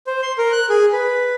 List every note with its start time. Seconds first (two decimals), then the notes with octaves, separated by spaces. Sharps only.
0.07 C5
0.22 C6
0.38 A#4
0.52 F#6
0.69 G#4
0.93 B4